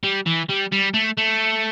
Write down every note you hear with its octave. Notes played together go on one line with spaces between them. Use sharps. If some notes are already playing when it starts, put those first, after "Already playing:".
G3
E3
G3
G3
A3
A3